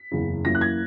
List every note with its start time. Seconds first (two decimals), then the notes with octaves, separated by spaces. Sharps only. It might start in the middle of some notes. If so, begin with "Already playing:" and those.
Already playing: B6
0.12 F#1 E2 C#3
0.45 F#2 E3 A#3 E4 A#6
0.55 F#6
0.61 G#6